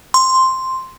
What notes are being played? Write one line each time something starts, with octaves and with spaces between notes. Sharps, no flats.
C6